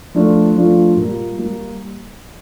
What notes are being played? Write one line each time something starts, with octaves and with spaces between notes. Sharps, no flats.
F3 A3 D4 F4
F3 A3 D4 F4
A#2 G3 A#3
G3 A#3